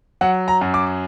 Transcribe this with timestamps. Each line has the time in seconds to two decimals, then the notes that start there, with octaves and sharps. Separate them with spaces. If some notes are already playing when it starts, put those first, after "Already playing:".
0.21 F#3 F#5
0.48 A#5
0.61 F#2
0.74 D6